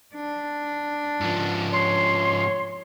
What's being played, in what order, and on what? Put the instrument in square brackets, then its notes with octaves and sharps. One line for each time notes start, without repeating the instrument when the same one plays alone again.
[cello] D4
[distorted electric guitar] G#2 F3
[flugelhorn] C#5 [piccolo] C6